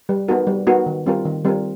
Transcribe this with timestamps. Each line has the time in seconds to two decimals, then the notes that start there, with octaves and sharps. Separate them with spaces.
0.09 G3
0.28 B3 D#4 F#4 A#4
0.47 G3
0.67 B3 D#4 F#4 A#4
0.86 D#3
1.06 G3 C4 F4 A#4
1.25 D#3
1.45 G3 C4 F4 A#4